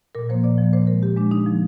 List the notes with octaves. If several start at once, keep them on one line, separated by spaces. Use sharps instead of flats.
A#2 A#4
F3 A#3 C5
A#2 D5
F3
A#3
A#2 C5
G#3 A#4
A#2 G4
G#3 D4
D3 D#4
F3 A#3